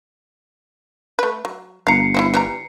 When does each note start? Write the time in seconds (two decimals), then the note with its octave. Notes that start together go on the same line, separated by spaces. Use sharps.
1.19 A3 B4
1.45 F#3
1.87 G1 F5 A#5 C7 C#7
2.14 C4 D#4 E4
2.34 E3 G3 A#5